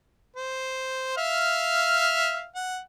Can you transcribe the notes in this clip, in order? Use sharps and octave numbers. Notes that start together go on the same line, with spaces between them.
C5
E5 F5 F6
F#5